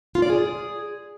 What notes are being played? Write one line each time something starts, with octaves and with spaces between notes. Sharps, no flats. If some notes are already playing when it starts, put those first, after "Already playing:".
F4
D5
G#4